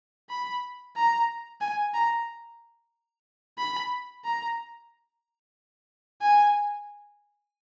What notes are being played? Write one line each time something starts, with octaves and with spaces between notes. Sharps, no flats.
B5
A#5
G#5
A#5
B5
A#5
G#5